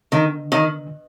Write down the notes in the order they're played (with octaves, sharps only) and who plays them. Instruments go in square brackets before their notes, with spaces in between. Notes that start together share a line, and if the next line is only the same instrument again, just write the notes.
[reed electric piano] D3 [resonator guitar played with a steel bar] D#3
[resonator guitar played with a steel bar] D#3